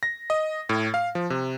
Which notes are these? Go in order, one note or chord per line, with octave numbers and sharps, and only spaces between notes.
A#6
D#5
A2
F5
F3
C3